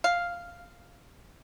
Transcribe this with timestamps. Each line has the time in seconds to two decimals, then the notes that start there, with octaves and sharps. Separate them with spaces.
0.04 F5